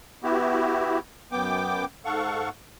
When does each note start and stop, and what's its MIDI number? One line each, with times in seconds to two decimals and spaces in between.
0.23 0.99 59
0.23 0.99 64
0.23 0.99 66
0.23 0.99 67
1.32 1.85 42
1.32 1.85 59
1.32 1.85 79
1.32 1.85 86
2.05 2.49 44
2.05 2.49 69
2.05 2.49 77
2.05 2.49 78
2.05 2.49 85